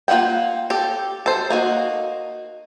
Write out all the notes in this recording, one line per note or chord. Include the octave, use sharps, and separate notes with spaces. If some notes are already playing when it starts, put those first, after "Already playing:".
A#3 F4 E5 F#5 G5
G4 A4
A4 C5
A#3 D#4 F#4